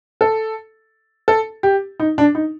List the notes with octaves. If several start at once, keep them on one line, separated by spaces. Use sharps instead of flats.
A4
A4
G4
D#4
D4
D#4